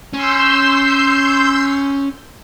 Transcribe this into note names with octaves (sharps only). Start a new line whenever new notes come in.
C#4 C6 E6 G6